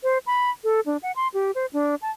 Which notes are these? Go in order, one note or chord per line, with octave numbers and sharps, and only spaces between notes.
C5
B5
A4
D4
F#5
C6
G4
C5
D4
A5